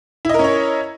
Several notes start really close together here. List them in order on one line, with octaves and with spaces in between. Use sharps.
E4 D#5 A#4 C#4 C#5